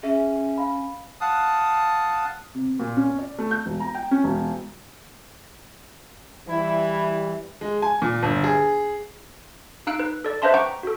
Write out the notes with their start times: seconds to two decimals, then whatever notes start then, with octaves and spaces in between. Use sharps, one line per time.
0.03 C#4 G#4 E5
0.58 F5 B5
1.21 F5 F#5 A5 D#6
2.54 C3
2.79 A#2
2.97 C#4
3.19 D5
3.39 A3
3.51 G6
3.66 E1
3.80 A#5
3.95 G5
4.11 C#4
4.24 E1
6.48 E3 G3 E4
7.61 G#3
7.82 G#5
8.02 A#2
8.22 G1
8.44 G#4
9.87 D#4 F5 E6 F#6 D7
9.99 B4
10.24 A4 D5
10.42 B4 C5 D#5 E5 A5 C6
10.54 F#5 G5 A#5 C#6 D6 G6
10.83 F#4 A4